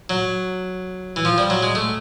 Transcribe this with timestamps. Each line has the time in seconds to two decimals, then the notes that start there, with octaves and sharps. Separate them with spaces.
0.10 F#3
1.16 E3
1.25 F3
1.38 G3
1.50 F#3
1.63 G#3
1.75 A3